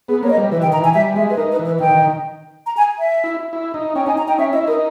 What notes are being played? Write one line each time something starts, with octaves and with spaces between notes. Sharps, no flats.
B3 G#4
A#3 C#5
D#5
G3
E3 B4
G5
D#3
A#5
E3 G#5
G3 E5
G#3 E5
B4
D#4 A#4
B4
E3
B4
D#3 G5
D#3
A#5
G#5
E5
E4
E4
D#4
C#4 G5
D#4 G#5
A#5
D#4 G5
C#4 E5
E4 D#5
D#4 A#4